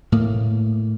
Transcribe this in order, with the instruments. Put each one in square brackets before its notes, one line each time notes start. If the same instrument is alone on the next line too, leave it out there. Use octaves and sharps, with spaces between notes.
[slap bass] A2 A#3